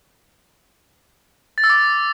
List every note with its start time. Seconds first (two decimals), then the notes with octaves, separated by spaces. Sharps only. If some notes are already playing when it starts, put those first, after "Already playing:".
1.58 A6
1.64 E6
1.70 D6